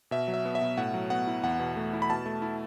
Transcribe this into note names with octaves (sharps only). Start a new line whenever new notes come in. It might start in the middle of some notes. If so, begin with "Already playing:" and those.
B2 E5
F#3
E5
B3
E5
B2
A2 F#5
F#3
B3 F#5
E4
E2 F#5
B2
A3
E4
B5
B2 A5
A3
E4